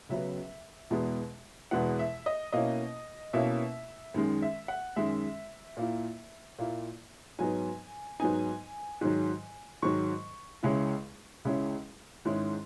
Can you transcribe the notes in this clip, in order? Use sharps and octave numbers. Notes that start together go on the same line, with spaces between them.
C#2 C#3 F#3 B3 E5
E2 B2 G#3 B3 E4
E2 B2 G#3 B3 E4 F#5
E5
D#5
B2 A#3 C#4 E4 D#5
B2 A#3 C#4 E4 E5
F#2 D#3 G#3
E5
F#5
F#2 D#3 G#3 E5
A#2 A#3 E4
A#2 A#3 E4
G#2 F#3 B3 D#4 G#5
G#2 F#3 B3 D#4 G#5
G#2 D#3 F#3
G#2 D#3 F#3 C#6
C#2 C#3 G#3 C#4 E4
C#2 C#3 G#3 C#4 E4
G#2 D#3 G#3 C#4 E4